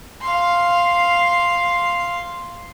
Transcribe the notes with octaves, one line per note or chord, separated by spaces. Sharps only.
F5 C6